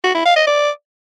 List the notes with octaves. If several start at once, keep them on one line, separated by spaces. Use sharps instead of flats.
F#4
E4
F5
D#5
D5